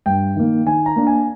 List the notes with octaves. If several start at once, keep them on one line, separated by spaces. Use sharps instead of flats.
G2 G5
D#3 A#3
D#3 G#5
A#5
A#3 D4
G#5